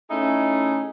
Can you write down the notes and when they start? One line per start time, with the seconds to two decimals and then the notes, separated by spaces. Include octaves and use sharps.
0.10 A3 C#4 D#4 E4 G#4